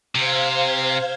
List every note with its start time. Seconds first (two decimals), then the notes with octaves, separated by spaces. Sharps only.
0.15 C3 C5 F5 G#6